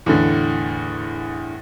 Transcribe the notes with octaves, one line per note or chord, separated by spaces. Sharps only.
E2 A2 D3